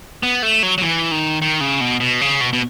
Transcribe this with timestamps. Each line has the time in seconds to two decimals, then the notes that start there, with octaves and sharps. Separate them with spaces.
0.23 B3
0.43 A3
0.63 F#3
0.78 F#3
0.82 E3
1.11 D#3
1.42 D#3
1.61 C#3
1.81 B2
2.00 B2
2.21 C#3
2.41 B2
2.53 B2